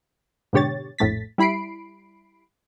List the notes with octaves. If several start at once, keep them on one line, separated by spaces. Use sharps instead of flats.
G#2 B2 D3 G4 C#5 A6
A#1 F2 A2 A3 A6 B6
G3 E4 B5 C7 D7